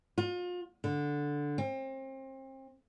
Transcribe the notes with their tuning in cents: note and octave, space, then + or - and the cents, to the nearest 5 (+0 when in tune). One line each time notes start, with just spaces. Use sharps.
F4 +35
D3 -5
C4 +35